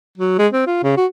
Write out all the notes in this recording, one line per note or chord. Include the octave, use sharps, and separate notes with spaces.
F#3
G#3
C4
F4
C#3
F#4